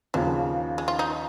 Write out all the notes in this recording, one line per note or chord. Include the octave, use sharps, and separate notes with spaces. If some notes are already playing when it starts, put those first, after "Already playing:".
D#2 C#3 F3 F#3
G#3
F4
D#4